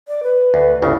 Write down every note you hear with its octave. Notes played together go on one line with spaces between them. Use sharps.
D5
B4
D2
G1 D2 C#3 E4